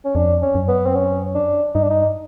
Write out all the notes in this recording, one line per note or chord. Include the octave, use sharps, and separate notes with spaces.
C#4
F2 D4
C#4
F#2
B3
C4
C#4
D4
G2 D#4
D4
D#4